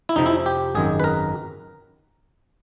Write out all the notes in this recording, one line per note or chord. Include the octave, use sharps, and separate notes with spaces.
E4
F2 C3 F3 D#4
E4
G4
G#1 F#2 D#3 G#3 G#4
B4
A#4